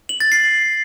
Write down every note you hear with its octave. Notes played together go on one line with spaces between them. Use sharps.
F#7
A6
C7